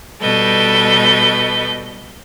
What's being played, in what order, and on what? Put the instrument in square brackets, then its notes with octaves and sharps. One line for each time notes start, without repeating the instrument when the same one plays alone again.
[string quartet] B2 G3 A4 B4 D#5 G6